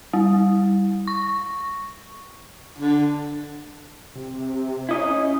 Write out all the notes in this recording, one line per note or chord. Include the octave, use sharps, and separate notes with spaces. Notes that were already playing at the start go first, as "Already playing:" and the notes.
G3
C#6
D3
C3
C#4 E4 D#5